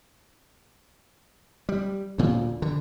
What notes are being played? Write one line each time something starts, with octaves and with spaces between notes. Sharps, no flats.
G3
D2 A#2
D3